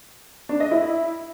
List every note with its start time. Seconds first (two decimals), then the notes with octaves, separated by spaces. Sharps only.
0.49 D4
0.60 D#5
0.71 E4